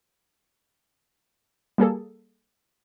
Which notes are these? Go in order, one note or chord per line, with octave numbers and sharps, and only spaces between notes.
G3 A#3 G#4 A4